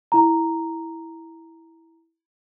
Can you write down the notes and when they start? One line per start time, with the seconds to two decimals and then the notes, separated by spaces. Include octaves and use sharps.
0.12 E4 A#5